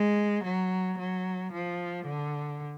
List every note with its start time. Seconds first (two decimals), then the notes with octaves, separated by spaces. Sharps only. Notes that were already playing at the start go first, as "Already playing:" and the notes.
Already playing: G#3
0.44 F#3
0.98 F#3
1.53 F3
2.06 D3